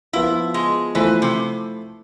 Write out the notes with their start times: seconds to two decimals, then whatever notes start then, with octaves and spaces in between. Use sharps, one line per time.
0.13 F3 B3 E4 F4
0.54 G#3
0.95 E3 F3 A3 E4 A4 C5
1.22 C3